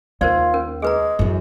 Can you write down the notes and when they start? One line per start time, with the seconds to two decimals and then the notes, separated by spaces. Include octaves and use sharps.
0.21 D#2 F4 A#4 C5 D5
0.54 C#4 A#4
0.82 G#3 G#4 B4 A#5
1.19 F#2 E3